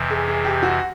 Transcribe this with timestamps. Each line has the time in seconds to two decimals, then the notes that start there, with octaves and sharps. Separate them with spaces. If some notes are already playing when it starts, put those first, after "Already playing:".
Already playing: F2 C3 E3
0.10 G#4
0.27 G#4
0.44 G4
0.62 F#4